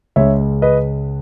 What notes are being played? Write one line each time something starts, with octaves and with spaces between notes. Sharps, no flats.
C#2 C#3 G#3 C#5 E5
B4 D#5